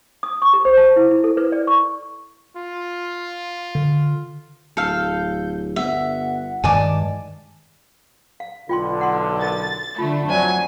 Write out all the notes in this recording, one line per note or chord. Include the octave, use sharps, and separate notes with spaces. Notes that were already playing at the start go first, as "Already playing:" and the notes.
D#6
C#6
G4
C5
A5
E4
E4
A4
B4
D5
C#6
F4
D3
D1 A4 F5 G6
G1 E5 F#5
G2 D#3 G#3 D5 G#5 A5 D6
F5
B1 D3 F4 G5 C6
F#5 C6
A#4 A5 A6
D3 A3 F4
F2 F#3 C5 D5 G#5